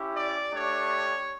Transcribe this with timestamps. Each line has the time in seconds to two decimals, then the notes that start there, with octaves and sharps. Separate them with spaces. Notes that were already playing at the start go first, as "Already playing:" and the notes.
Already playing: C#4 E4 G4
0.14 D5
0.52 A3 D4 G4 C#5